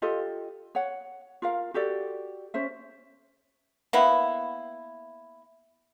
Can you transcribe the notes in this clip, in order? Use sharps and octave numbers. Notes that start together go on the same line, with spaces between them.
F4 G4 A4 D#5
C#5 F#5
F4 A#4 F5
F#4 G4 A4 D5
C#4 C5 E5
A#3 B3 E4